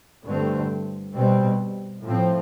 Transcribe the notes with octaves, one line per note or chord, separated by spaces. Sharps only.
G2 D3 A3 C4
B2 G3 C4
A2 F3 C4